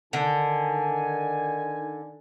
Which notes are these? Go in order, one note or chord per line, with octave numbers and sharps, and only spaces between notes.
D3 D#3 G#5